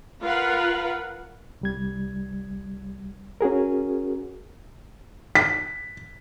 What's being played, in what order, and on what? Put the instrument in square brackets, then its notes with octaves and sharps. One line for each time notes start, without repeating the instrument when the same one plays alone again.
[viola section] F4 A#4 B4 F5 F#5
[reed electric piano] C2 G3 G#6
C#4 F#4 G#4 A#4
[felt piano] B6